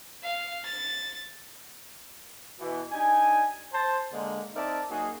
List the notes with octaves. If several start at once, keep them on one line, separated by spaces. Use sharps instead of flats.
F5
A6
B2 E3
D4 D#4 G4 G#5
C5 A5
D3 G#3 A#3
C4 D#4 A#4 D5 E5 A5
F#2 A#3 D#4 F#4 G#4